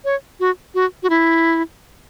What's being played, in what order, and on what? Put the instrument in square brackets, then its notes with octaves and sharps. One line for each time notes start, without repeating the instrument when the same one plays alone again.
[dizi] C#5
F#4
F#4
F#4
E4